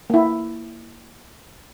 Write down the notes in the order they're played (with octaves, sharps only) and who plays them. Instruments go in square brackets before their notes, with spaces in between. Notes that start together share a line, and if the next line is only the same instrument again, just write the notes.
[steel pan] A#3 E4